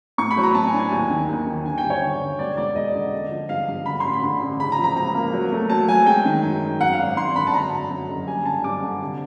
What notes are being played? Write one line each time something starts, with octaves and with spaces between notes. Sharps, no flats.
A2 C#6
B5
F#3
A#5
A2 A5
G#5
D4
G#5
D#2
D#3
D#2
D#3
D3 G#5
G5
G2
C#5
D3
D3
E1 D5
E1 D5
E1 D#5
D3
D3
F3
G2 F5
G2
D3 B5
A1 C6
B5
D3
A1
C#3 B5
A#5
F3
A#5
C#2 A#5
A#3
F#3
A3
F#3 A5
F#3 G#5
G#3 G5
D#3
F#2
F#2
F#2 F#5
F5
G#1
G#1 C6
D3 B5
A5
F#2 A#5
F#2
F#2
F#1
G3 G#5
D3 A5
G2 D6
D3
C3